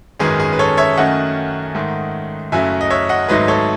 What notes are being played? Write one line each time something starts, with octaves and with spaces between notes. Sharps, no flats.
G#1 F#2 D#3 G#3 C#4 G#4 B4
G#4
B4
A4 C#5
C#5 E5
F#2 D#3 A3 C#4 D#5 F#5
G#2 D#3 A3
F#1 F#2 C#3 F#3 A3 E5 G#5
D#5
C#5 E5
D#5 F#5
G#1 G#2 F#3 A3 B4 D#5
A4 C#5